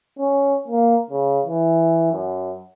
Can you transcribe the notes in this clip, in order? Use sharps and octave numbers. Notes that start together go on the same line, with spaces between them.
C#4
A#3
C#3
E3
F#2